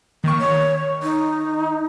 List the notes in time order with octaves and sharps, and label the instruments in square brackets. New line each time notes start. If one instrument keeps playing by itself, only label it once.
[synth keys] D#3 C#6 [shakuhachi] A#3
[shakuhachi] C#5
D#4